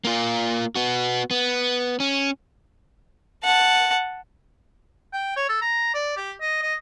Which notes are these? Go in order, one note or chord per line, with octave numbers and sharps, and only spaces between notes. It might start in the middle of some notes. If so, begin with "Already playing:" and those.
A#3 F4
B3 F#4
B3
C#4
F#5 A5
G5
C#5
A4
A#5
D5
G4
D#5
D#5